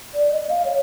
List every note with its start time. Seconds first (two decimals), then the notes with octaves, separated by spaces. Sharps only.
0.14 D5
0.31 D#5
0.49 F5
0.65 C#5